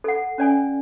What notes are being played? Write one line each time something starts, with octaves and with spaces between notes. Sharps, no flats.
A4 F#5
C#4 D5 G#5